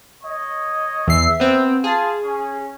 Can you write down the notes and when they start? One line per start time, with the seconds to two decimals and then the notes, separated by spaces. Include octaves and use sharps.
0.24 C#5 D#5
1.07 E2 E5 C7
1.40 B3 C4
1.84 F4 G#4 F5 A5
2.24 C#4